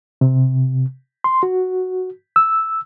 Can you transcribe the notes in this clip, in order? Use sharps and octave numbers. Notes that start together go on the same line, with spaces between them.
C3
C6
F#4
E6